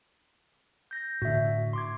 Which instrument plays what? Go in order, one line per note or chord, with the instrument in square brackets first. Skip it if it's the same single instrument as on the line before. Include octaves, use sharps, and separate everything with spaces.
[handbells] G6 A#6
[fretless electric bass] A2 D3 [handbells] F#4 E5
[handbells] C6 D6 G#6